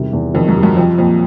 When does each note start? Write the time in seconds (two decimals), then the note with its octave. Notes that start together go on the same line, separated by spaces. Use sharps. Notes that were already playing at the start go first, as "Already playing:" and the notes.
Already playing: E2 C3 D#3 G3
0.13 E2
0.34 F2 D#3
0.48 F#2
0.56 G3
0.63 F#2
0.76 F2 F3
0.98 F2 A#2